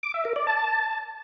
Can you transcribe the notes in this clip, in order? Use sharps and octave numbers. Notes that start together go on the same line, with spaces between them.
D6
E5
A#4
D5
A5